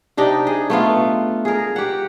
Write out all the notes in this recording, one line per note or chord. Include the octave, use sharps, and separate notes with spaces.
C3 D4 D#4 G4
G#4
A3 B3 F4
G#4 A#4
G4 F#5